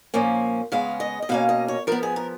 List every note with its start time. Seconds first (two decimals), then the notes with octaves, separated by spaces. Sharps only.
0.14 A#2 F3 A#3 C#4
0.72 C#3 G#3 B3 F5
1.00 D#5
1.22 D#5
1.29 B2 A#3 C#4 F5
1.49 D#5
1.68 C#5
1.87 F3 B3 A#4
2.03 G#4
2.16 A#4